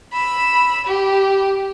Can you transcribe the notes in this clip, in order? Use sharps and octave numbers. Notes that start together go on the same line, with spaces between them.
B5 E6
G4